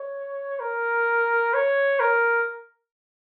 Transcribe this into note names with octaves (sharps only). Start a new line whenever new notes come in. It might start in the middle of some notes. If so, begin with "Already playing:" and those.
Already playing: C#5
A#4
C#5
A#4